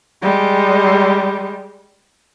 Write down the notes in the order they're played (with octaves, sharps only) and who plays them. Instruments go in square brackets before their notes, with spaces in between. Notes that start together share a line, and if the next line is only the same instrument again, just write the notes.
[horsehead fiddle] G3 G#3